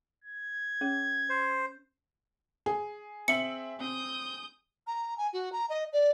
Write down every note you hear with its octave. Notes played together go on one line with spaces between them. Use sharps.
G#6
C#4 G#4 C#5
C5
G#4
C4 E5 C#7 F#7
C4 D#6 G6
A#5
G#5
F#4
A#5
D#5
D5